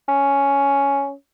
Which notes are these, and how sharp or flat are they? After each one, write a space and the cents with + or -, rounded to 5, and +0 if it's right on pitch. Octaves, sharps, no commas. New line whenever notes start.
C#4 +5